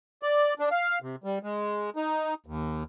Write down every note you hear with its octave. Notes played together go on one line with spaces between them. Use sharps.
D5
D4
F5
C3
G3
G#3
D#4
D#2